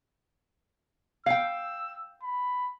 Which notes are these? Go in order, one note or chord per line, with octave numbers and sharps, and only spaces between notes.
F5 G5 E6
B5